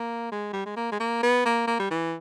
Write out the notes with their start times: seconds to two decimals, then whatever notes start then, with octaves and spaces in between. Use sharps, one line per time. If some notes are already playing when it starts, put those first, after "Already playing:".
Already playing: A#3
0.32 G#3
0.53 G3
0.65 G#3
0.77 A#3
0.92 G#3
1.00 A#3
1.23 B3
1.45 A#3
1.67 A#3
1.79 G3
1.91 E3